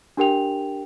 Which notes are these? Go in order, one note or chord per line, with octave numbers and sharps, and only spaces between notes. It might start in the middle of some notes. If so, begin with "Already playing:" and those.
D4 G4 A#4 G5 F7